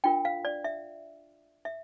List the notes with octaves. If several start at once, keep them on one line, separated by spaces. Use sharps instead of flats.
D4 F4 A#4 G5
F5
D5
E5
E5